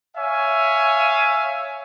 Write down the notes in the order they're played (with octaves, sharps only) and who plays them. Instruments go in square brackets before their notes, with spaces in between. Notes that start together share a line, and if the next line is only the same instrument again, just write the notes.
[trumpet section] C#5 E5 F5 G#5